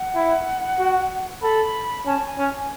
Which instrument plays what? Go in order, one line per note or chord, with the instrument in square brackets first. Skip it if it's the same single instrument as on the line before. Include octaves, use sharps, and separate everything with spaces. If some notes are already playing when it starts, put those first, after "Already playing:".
Already playing: [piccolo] F#5
[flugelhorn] E4
F#4
[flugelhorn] A4 [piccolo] B5
[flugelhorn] C#4 [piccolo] A5
[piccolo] G#5
[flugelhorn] C#4
[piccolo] G#5